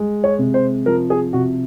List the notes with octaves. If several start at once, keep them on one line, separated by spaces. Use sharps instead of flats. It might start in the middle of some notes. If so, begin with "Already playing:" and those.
Already playing: G#3
C#5
C3
C5
F3 A#4
G#4
C3 F#4